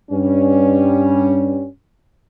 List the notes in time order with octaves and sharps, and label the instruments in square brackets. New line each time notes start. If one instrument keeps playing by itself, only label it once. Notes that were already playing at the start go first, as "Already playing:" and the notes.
[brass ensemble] G2 G3 C#4